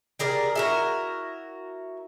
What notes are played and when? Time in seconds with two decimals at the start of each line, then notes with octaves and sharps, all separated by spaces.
0.19 G4 G#4 A#4 D5
0.55 E4 F#4 A#4